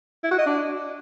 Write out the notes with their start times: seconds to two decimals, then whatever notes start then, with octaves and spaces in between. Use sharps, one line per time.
0.23 E4
0.31 F#4
0.38 D#5
0.46 D4